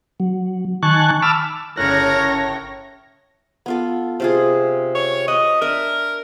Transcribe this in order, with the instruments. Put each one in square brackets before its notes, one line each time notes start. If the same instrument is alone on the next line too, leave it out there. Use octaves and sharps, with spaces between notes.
[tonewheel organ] F#3
D#3 G#5 A5 C#6 F#6
A5 B5 D6 E6 F6
[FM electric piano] G1 F#6 [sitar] A2 C#3 [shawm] A#4 [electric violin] C#5 A#6
[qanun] B3 F4 A4
C3 F4 G#4
[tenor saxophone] C#5
[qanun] B4 [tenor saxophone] D#5
[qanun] D4 E5 [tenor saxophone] A#4